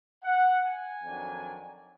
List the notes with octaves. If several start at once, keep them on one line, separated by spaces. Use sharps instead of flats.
F#5
G#5
F2 D#3 F#3 D4